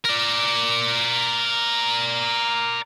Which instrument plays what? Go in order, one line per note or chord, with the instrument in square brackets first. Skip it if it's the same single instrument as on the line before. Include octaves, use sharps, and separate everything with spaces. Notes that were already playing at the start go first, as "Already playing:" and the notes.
[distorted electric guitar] A#4 D5